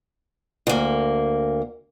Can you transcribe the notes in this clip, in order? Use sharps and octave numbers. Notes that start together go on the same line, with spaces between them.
D2 A#3